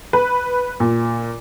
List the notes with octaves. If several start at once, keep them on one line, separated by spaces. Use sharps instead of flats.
B4
A#2